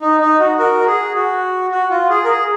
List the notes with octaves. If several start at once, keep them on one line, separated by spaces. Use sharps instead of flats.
D#4
D#4
F#4
F#4 A#4
F#4
G#4
F#4
F#4
F4
G#4
A#4
G#4